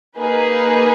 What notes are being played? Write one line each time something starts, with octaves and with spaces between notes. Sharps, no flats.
A#3 D#4 G#4 B4